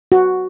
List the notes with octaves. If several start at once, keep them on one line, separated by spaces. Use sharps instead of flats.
F#4